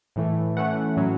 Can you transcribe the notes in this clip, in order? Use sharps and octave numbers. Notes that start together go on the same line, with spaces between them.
A2 E3 A3
E3 A3 C#4 F#5
A2 F#3 C#4